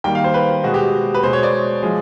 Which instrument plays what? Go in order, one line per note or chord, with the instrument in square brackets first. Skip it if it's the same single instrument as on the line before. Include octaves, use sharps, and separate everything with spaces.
[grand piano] D#3 G3 A#3 G5
F5
C5
B4
B2 G#3 F#4
G4
B4
B2 G#3 C5
C#5
D5
F3 G#3